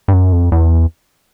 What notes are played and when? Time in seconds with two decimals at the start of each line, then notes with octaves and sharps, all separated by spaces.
0.08 G2
0.13 F#2
0.32 F2
0.52 E2